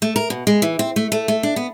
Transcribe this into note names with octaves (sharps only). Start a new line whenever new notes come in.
A3
A#4
B2
G#3
E3
C4
A3
A3
A3
D4
B3